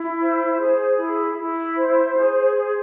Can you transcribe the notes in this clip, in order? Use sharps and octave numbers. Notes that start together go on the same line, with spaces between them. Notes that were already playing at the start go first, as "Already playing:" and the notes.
Already playing: E4
C5
G#4
E4
E4
C5
G#4
C5